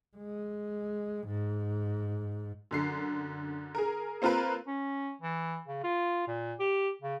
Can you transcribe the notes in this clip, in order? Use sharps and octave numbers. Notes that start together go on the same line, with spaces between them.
G#3
G#2
F#2 D3 C7
G#4 A#4
A#3 C4 F4 A#4 B4
C#4
E3
C#3
F4
A#2
G4
C#3